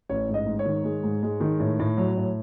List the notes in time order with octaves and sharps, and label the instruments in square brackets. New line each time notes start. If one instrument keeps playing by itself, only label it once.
[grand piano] A1 C#5
G#2
D#5
G#2
C#5
D#3
G#3
G#2
G#3
D#3
A2
A2
F#3
A2